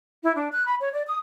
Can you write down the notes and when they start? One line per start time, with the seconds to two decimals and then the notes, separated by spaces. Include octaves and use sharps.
0.22 E4
0.36 D4
0.52 F#6
0.67 B5
0.80 C#5
0.92 D5
1.05 D#6